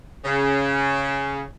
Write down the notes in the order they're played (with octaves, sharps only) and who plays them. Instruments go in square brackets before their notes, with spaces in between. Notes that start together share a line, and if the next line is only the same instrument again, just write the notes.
[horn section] C#3